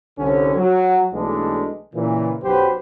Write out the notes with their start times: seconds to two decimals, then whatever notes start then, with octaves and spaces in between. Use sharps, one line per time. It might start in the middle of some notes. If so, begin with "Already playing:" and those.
0.19 C2 D3 C#4
0.56 F#3
1.13 B1 E3 G#3 A3 D4
1.94 A#2 C#3 E3
2.43 B1 F#2 F#3 G4 B4 C5